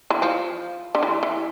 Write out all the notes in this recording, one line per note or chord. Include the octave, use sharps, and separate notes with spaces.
E3
F3
D3
E3
E3